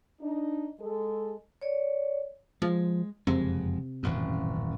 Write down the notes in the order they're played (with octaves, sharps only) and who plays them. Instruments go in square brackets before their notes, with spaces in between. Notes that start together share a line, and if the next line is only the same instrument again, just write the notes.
[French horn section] D4 D#4
G#3 A4
[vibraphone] C#5 D5
[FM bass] F3 [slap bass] G#3
[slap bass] F#1 F2 G#3 [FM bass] C3
[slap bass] D#1 A1 F#2